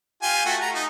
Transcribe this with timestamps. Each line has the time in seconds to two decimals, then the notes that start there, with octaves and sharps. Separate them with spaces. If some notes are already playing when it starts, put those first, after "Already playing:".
0.23 F4 G4 G#5
0.46 A3 F#4
0.61 A#5
0.75 D#4